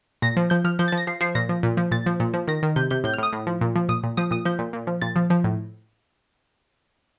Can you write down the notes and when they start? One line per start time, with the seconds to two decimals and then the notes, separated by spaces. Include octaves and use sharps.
0.22 A#2 A#6
0.37 F3
0.50 F3 G6
0.64 F3 F6
0.79 F3 G6
0.88 A6
0.92 F3
0.97 A#6
1.07 F3 C7
1.21 F3 C7
1.35 A#2 A#6
1.49 F3
1.63 A#2
1.77 F3
1.91 A#2 A6
2.06 F3
2.20 A#2
2.34 F3
2.47 D#3 A#6
2.63 D#3
2.76 C3 G6
2.91 C3 G6
3.04 A2 G6
3.14 F6
3.18 A2 D#6
3.33 A2
3.47 F3
3.61 A#2
3.76 F3
3.89 A#2 D#6
4.03 A#2
4.17 F3 D#6
4.31 A#2 D#6
4.45 F3 G6
4.59 A#2
4.73 A#2
4.87 F3
5.02 A#2 A6
5.16 F3
5.30 F3
5.44 A2